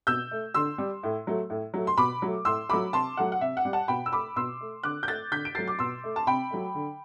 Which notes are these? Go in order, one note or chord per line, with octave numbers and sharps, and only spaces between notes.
B2 E6 G6
A3
D3 C6 E6
G3
A2
F#3 A3
A2
F#3 A3
C6
B2 B5 D6
F#3 A3
A2 C6 E6
F#3 A3 B5 D6
C3 A5 C6
F#3 A3 F#5
F#5
C3 E5
F#5
G3
F#5 A5
B2 G5 B5
E6
A3 B5 D6
B2 C6 E6
A3
D3 D6 F#6
G6
A3 F#6 A6
D3 G6 B6
D7
F#3 A3 A6 C7
D6
B2 C6 E6
A3
A5
C3 G5 B5
F#3 A3
D3